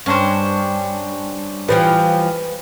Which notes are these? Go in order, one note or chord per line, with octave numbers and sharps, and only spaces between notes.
G2 C#4 D4 C5
E3 F3 G3 B4